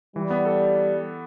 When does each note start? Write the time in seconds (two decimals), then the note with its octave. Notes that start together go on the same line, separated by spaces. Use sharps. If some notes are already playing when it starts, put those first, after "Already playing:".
0.16 E3 G3
0.30 B3
0.45 A4